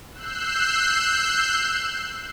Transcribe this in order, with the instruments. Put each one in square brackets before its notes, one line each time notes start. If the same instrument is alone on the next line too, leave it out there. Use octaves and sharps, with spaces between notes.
[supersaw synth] E6 F#6 G6 C7